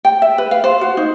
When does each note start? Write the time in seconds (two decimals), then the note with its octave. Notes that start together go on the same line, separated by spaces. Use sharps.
0.05 G5
0.22 E5
0.38 B4
0.51 F5
0.64 C5
0.81 F#4
0.97 D#4